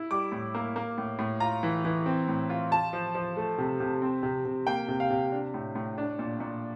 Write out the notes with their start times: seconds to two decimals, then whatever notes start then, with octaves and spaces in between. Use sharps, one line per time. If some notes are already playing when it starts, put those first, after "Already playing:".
Already playing: E4
0.11 G3 D6
0.32 A2
0.55 A#3
0.76 A#3
0.98 A2
1.19 A2
1.40 F4 A#5
1.63 E3
1.85 E3
2.06 C4
2.28 A2
2.50 F4
2.71 F4 A5
2.93 F3
3.15 F3
3.37 A3
3.58 C3
3.80 C3
4.02 C4
4.23 C3
4.45 C3
4.67 A#3 G5
4.88 C3
5.00 F5
5.10 C3
5.32 D4
5.54 A2
5.75 A2
5.98 D4
6.19 A#2
6.40 A#2